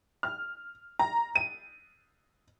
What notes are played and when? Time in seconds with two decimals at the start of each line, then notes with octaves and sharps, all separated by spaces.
0.23 F6
0.99 A#5
1.35 D#7